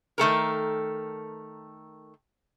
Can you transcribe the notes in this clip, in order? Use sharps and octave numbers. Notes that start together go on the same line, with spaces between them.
D#3 A3 A4 A#4